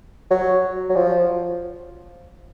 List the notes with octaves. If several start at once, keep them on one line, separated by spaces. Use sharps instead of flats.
F#3
F#3
F3